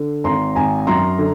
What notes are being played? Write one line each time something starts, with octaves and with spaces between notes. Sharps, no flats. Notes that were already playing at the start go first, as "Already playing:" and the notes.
Already playing: D3
G#1 A#5 C6
G#1 G#5 A#5
F#2 A#5 C6
D3